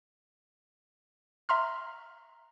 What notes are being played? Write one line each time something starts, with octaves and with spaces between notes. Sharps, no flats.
E5 A#5 C6 F6